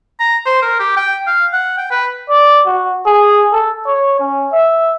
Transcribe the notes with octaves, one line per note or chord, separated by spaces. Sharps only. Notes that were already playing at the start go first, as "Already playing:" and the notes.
A#5
C5
A#4
G4
G5
F5
F#5
G5
B4
D5
F#4
G#4
A4
C#5
C#4
E5